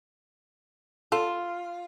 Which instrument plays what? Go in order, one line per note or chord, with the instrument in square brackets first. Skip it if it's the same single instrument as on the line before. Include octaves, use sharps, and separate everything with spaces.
[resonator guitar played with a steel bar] F4 [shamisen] A4